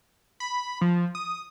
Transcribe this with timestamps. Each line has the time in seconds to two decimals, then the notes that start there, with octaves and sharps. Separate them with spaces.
0.40 B5
0.81 F3
1.15 D#6